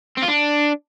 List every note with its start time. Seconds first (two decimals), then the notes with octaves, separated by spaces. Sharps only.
0.18 C4
0.23 F4
0.28 D4